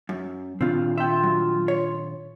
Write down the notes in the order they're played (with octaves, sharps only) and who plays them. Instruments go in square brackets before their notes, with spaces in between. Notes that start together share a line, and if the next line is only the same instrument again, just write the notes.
[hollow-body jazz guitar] F#2
[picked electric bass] A#2 D#3 D4 [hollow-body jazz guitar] C4 F4
[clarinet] F4 [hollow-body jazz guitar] E5 G5
[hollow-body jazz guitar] F#3
C#5